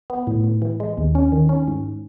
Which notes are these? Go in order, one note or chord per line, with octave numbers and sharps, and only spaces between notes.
B3
A2
A2
E3
G#3
D#2
C#4
D#3
C#4
G#2